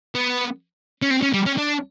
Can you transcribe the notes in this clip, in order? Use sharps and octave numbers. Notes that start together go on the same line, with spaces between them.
B3
C#4
C4
C#4
G3
C#4
D4